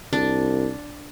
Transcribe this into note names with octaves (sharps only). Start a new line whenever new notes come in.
C2 D4